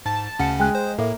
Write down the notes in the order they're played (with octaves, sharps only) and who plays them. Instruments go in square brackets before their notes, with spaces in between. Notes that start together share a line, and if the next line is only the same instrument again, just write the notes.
[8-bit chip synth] G#2 [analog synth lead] A5
[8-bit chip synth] D2 C#3 C#4 [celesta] F#5 C#7
[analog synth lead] G#3 [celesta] G5 G#5 F#6
[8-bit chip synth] C5
[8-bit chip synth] A2 [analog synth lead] A#3 [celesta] A4 A#4 E5